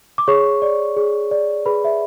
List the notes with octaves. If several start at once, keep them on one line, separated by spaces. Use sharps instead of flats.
D6
G#4 C#5 C#6
D5
G#4
D5
G#4 B4 B5
E5